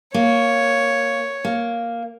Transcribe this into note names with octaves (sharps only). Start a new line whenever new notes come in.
A#3 C#5
A#3